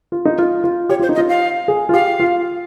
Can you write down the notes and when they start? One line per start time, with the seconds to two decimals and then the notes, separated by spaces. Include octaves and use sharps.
0.12 F4
0.25 D#4
0.38 F4
0.64 F4
0.89 G4 C#5
0.99 F4 C5
1.09 D#4
1.15 D#5
1.18 F4
1.29 F5
1.68 G#4
1.89 F4
1.93 G4 F5
2.20 F4